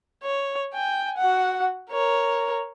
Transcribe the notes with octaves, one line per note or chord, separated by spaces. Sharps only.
C#5
G5 G#5
F#4 F#5
A#4 C#5